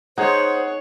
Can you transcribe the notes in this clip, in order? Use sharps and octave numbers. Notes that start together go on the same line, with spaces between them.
D#4 G#4 C5 C#5 F#5